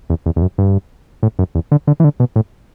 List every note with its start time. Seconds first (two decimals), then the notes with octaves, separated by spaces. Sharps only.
0.10 E2
0.26 E2
0.36 E2
0.42 F#2
0.58 G2
1.23 A2
1.39 F#2
1.55 E2
1.72 D3
1.87 D3
2.00 E3
2.04 D3
2.20 B2
2.36 A2